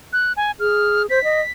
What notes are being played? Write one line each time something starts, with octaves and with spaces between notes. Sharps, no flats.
F#6
G#5
G#4 F6
C5 B6
D#5